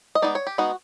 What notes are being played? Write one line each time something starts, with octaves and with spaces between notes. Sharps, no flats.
D#5
G#3 B3 D#4 D5
C#5
G4
G#3 B3 D#4 F#4